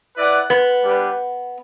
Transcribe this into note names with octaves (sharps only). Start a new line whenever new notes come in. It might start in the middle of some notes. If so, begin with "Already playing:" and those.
E4 B4 D5 F#5
B3
G3 D4 G4 B4